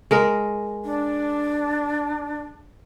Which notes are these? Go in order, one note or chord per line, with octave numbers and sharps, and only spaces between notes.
G#3 A#4
D4